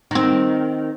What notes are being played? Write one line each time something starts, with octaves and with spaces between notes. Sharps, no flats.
D#3 C4